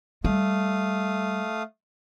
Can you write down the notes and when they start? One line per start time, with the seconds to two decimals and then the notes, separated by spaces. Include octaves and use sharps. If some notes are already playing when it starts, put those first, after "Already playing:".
0.25 G3 A3 F5 D#6